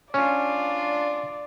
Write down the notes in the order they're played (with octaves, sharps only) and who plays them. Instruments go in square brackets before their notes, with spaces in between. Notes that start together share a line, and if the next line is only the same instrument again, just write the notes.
[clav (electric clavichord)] C#4 [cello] D4 F4 [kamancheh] D5